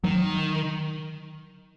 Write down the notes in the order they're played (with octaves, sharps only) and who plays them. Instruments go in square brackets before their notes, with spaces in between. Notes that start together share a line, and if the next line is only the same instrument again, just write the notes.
[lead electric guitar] D#3 [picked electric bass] F#3